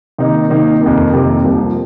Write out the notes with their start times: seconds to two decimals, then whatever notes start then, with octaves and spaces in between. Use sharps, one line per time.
0.18 C3 D#3 A#3 D#4
0.50 C3 D#3 A#3 D#4
0.81 F2 C3 D#3 A#3
1.13 F2 C3 D#3 A#3
1.44 C2 C3 F3 A#3 F4